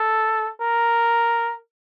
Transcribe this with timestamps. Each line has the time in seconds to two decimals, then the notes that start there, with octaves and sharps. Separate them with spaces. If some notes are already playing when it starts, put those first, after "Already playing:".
Already playing: A4
0.61 A#4